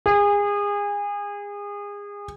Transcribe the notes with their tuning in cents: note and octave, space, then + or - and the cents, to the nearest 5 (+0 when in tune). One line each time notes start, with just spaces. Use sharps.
G#4 -30